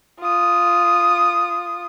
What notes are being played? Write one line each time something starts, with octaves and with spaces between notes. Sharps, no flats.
F4 D#6